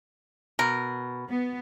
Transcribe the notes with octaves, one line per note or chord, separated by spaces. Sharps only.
B2 A#4
B3